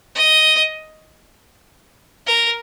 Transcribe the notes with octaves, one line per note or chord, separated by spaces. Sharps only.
D#5
A#4